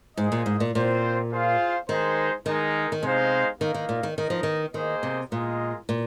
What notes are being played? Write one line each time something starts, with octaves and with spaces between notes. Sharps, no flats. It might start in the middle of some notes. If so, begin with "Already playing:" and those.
G#2 A#3 G#4 C5 D#5
A#2
G#2
A#2
A#2 C4 F4 C5
F4 G#4 C5 F5
D#3 G#3 D#4 C5
D#3 G#3 D#4 A#4
D#3
C3 G#3 D#4 C5 F5
D#3 A#3 D#4 A#4 F5
D#3
A#2
D#3
D#3 D#4 A#4 D#5
F3
D#3
D#3 A#3 G#4 C5 D#5
C3
A#2 G#3 F4 A#4 D#5
A#2